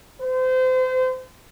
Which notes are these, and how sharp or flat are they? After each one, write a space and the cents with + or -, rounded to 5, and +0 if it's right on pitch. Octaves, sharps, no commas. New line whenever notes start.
C5 -30